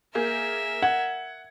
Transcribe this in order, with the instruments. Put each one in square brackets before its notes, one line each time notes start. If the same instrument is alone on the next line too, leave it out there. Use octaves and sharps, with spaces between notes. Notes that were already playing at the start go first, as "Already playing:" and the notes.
[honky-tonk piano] A#3 G#4 G6 [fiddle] A#4 E5
[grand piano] F#5 [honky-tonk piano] G#6